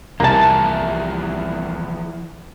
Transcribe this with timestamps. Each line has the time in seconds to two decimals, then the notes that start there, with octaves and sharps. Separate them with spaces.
0.20 C2 E3 F3 A#3 G#4 A5